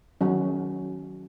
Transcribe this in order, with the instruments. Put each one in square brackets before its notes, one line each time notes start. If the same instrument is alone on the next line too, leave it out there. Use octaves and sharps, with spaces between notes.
[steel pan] D#3 F#3 C#4